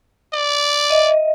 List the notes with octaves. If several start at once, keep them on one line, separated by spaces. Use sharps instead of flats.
D5
D#5 E5